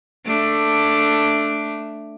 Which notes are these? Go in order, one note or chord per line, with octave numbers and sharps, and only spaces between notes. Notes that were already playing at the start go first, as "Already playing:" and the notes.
A3 D4